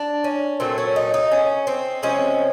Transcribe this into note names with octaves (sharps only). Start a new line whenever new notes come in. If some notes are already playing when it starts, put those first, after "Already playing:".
Already playing: D4
C#4
A#2 F#3 A3 C4
C#4
D#4
D#4
C#4
C4
C3 F3 G#3 C4 C#4